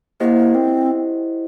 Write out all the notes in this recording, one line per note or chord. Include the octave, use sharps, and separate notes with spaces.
A#3 E4 G4 C5 D#5 F#5
C4